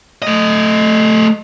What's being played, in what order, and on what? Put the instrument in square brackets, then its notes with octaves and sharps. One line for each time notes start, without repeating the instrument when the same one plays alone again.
[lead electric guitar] A3 D#5